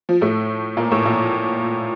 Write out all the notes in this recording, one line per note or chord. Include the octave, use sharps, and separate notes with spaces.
F3
A2 A3
A#2 A#3
A2 A3
A#2 A#3